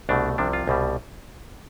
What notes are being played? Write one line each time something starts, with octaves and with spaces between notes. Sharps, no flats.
C2 B2 A3 D4
C2 C3 F3 D4
F4
C2 B2 G3